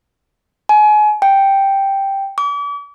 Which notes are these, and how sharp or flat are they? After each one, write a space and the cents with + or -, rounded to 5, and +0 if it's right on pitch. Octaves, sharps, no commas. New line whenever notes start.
G#5 +30
G5 +0
D6 -40